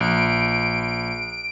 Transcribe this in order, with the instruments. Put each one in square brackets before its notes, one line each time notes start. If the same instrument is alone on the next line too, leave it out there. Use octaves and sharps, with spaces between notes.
[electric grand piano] A#1 [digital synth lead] D7